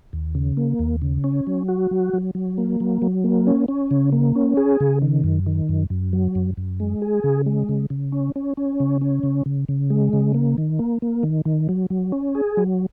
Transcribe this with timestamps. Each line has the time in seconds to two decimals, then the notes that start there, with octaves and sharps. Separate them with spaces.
0.13 D#2
0.35 C#3
0.57 A#3
0.79 D#2
1.02 C#3
1.24 C#4
1.47 F#3
1.68 F#4
1.91 F#3
2.13 F#3
2.35 F#3
2.58 A#3
2.80 F#3
3.02 F#3
3.24 A#3
3.47 C#4
3.68 C#4
3.91 C#3
4.12 A#3
4.35 C#4
4.57 G#4
4.80 C#3
5.02 D#3
5.24 F#2
5.46 D#3
5.69 F#2
5.90 F#2
6.13 F#3
6.35 F#2
6.57 F#2
6.80 G#3
7.02 G#4
7.24 C#3
7.46 G#3
7.69 C#3
7.90 C#3
8.12 C#4
8.36 C#4
8.57 C#4
8.80 C#3
9.01 C#4
9.23 C#3
9.46 C#3
9.68 C#3
9.90 G#3
10.13 C#3
10.34 A#3
10.58 D#3
10.79 A#3
11.02 A#3
11.23 D#3
11.45 D#3
11.69 F#3
11.90 F#3
12.12 C#4
12.35 G#4
12.57 F#3